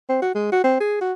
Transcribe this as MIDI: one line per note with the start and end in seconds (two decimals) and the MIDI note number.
0.09 0.20 60
0.22 0.32 66
0.35 0.49 56
0.52 0.63 66
0.64 0.78 60
0.80 1.00 68
1.01 1.13 66